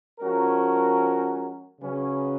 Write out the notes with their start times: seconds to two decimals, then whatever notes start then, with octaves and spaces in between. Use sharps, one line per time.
0.19 F3 G#3 C#4 F#4 A#4
1.81 C#3 F#3 C#4 G#4 B4